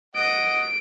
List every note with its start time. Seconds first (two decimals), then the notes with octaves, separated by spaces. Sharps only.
0.16 D#5 F#5 D7